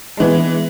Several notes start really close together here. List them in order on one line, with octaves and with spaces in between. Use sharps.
G#3 E3 B3